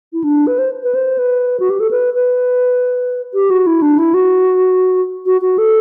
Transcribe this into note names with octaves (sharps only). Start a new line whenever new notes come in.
E4
D4
B4
C5
B4
C5
B4
F#4
G4
A4
B4
B4
G4
F#4
E4
D4
E4
F#4
F#4
F#4
A4